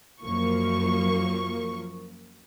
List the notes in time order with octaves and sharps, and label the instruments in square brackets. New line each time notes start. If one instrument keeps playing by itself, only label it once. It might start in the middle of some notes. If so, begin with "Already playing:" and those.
[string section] F#2 F3 A#3 C#6